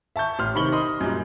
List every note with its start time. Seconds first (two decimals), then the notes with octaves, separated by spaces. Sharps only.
0.16 E5 A5 C#6 G6
0.39 A1 C6 F6
0.55 C3 D#3 B5 C#6 F#7 G7
0.72 D#5 C6 D#6
1.00 F#2 A#2 G3